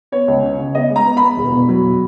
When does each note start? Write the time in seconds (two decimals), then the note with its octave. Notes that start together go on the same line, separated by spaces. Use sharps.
0.12 B3 C#5
0.28 C#2
0.43 C#3
0.59 C#3
0.75 B3 D#5
0.91 G#3
0.96 A#5
1.06 B3
1.17 B3 B5
1.37 E1
1.52 B2
1.68 F#3
1.84 B2